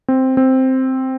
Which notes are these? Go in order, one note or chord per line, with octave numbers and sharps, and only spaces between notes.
C4
C4